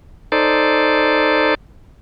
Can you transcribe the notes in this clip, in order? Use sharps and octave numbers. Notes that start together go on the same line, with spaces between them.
D#4 A4 C5 D5